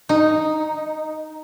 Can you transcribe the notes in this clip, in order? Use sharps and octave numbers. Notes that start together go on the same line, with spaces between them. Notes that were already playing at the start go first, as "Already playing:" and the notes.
D#4